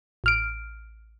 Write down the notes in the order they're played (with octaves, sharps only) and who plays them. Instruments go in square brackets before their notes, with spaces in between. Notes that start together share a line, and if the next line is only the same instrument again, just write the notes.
[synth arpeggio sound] A1 F6 D7